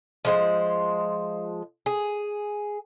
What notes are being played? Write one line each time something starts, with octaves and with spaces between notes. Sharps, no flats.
F3 G#3 C5
G#4